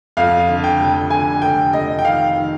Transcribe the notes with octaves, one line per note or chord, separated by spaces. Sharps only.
F2 F5
D3
G5
F1
D3 G#5
F1 G5
F1 D#5
G5
D#3 F5
D#3